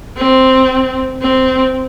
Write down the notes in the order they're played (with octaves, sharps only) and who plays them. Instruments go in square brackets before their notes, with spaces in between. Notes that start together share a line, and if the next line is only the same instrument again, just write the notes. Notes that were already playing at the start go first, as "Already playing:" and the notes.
[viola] C4
C4